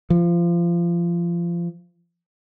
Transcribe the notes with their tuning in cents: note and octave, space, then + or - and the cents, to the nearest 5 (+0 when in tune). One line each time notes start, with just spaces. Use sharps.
F3 -25